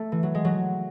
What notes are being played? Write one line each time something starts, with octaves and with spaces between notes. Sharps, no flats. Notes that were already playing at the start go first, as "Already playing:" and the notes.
Already playing: A3
E3
F#3
G#3
F#3